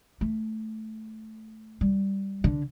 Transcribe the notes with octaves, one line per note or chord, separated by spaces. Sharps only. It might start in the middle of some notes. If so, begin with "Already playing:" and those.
A3
G3
D3